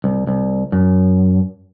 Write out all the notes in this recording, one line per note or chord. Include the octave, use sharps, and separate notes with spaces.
C2
C2
F#2